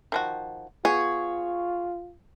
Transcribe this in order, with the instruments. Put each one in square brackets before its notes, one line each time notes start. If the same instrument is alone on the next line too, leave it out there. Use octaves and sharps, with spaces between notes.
[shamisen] D#3 F3 F#4
[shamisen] B3 [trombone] F4 [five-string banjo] G#4 [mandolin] C#5